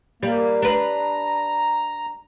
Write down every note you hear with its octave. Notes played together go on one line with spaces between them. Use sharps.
G3 A#3
D4 B4 A#5